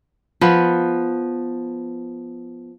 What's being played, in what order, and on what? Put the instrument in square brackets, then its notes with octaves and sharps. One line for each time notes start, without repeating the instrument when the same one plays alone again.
[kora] F3 B3 B4